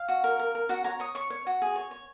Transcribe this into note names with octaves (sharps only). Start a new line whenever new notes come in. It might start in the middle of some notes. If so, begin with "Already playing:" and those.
Already playing: F5
F#4
A#4
A#4
A#4
F#4 F#5
C#5 A#5
C#5 D#6
C#5 C#6
C#5
F#4
G#4
C#5
C#5